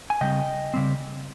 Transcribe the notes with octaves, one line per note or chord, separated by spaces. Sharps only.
G#5
C#3 G3 C4 D#5 G5
C#3 G3 C4